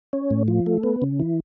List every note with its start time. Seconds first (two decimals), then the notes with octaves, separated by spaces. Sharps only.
0.13 C#4
0.30 A2
0.48 F3
0.66 A3
0.83 B3
1.02 C#3
1.20 E3